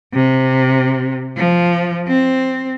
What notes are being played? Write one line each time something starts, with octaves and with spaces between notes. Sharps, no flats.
C3
F3
C4